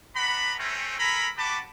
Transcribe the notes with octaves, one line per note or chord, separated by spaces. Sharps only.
B3 D4 F#5 A#5 B5
A3 C4 C#4
A4 A#4 G#5 A#5 B5
F#4 G4 B4 A5 B5 D6